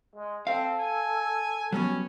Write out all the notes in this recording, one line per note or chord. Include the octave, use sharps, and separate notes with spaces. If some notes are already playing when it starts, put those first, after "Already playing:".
G#3
C4 A4 F5
G#5
F#3 G3 B3 C#4